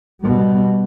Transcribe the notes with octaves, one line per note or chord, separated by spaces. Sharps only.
B2 G3